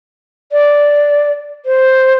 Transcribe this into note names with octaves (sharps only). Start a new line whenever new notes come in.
D5
C5